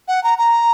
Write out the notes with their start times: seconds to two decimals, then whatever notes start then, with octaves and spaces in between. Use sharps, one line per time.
0.08 F#5
0.24 A#5
0.38 A#5